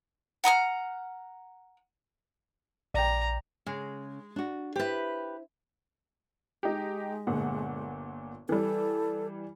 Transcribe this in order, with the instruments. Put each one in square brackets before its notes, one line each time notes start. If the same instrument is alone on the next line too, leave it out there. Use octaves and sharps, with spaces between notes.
[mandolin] F#5 A#5 D#6 F6
[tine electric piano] A#1 [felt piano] D5 G5 [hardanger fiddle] A#5
[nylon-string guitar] C#3 [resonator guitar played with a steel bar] G#3
[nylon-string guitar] D4 F#4
[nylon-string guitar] E4 C5 [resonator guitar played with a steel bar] G4 B4
[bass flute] G#3 [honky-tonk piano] D#4 G4
[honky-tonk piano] G1 A#2 F#5
[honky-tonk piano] E3 G3 [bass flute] A4